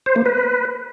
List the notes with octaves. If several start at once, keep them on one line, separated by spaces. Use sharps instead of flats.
C5
A#3
B4